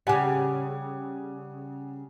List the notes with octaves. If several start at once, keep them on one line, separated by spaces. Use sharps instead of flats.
C#3 G3 F#5 G#5 D6